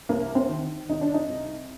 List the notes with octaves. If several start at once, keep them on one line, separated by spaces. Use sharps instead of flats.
C2 A#3
C4
D#3
C2 D#4
D4
D#4
C2